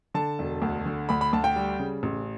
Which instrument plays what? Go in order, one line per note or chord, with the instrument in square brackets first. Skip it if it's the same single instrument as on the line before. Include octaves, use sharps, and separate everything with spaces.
[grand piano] D3 A5
E1
D2
D3
D2 B5
B5
D2 A5
G5
G3
C#3
A1